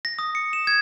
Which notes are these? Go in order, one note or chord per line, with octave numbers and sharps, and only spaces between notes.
A#6
D#6
C#7
E7
G#6